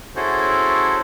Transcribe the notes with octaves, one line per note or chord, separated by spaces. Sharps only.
C#4 E4 F#4 G#4 A4 C5